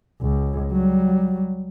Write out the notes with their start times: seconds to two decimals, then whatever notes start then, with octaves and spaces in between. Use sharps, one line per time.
0.21 C#2
0.71 F#3 G3